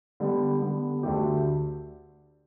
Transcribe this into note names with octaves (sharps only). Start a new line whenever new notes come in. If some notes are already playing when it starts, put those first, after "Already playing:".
D3 G3 B3
D3 G3 B3
D2 D3 A3 G4